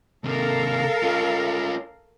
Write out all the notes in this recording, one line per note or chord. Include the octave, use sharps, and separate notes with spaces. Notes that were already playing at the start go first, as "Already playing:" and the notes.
D#2 C3 A4 A#4 F5
C#4 F4